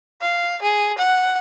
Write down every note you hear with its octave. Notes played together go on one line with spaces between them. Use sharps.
F5
G#4
F#5